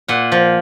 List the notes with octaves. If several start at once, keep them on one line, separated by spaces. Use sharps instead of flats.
A#2 F#5
F3